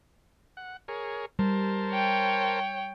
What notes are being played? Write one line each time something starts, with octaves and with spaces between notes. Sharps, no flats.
F#5
G#4 A#4 C#5
G3 A#4 C5 A5
C#5 G5